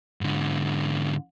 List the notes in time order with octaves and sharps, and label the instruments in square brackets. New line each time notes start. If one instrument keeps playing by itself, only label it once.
[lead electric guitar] G#2 D3